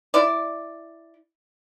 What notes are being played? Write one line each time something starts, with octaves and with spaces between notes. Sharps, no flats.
E4 D5